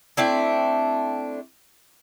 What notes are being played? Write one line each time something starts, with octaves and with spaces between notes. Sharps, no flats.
A3 C4 D4 E4